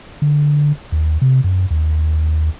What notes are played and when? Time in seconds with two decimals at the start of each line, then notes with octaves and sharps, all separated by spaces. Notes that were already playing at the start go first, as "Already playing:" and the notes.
0.22 D3
0.92 D#2
1.22 C3
1.44 F#2
1.71 D#2